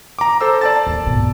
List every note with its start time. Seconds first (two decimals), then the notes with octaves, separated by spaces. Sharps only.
0.19 A#5 D6
0.41 A4 C5 E6
0.61 D5 A5 A6
0.87 D#2
1.03 G#2 B2